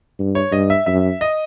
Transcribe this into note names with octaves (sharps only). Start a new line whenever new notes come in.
G2
C#5
G2 D#5
E5
F#2 E5
D#5